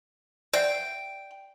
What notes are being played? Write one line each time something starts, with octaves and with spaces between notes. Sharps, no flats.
D5 E5 F#5 G5